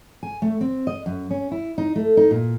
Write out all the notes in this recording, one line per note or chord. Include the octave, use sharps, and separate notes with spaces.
G#5
A3
C4
D#5
F#2
C#4
E4
D#4
A3
D#4
A#2